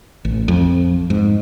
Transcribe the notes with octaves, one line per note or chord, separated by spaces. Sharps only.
A1
F2
G#2